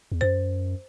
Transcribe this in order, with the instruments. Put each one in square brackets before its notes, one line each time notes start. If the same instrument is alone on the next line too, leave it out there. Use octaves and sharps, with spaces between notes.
[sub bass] E2
[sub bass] F#2 [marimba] C5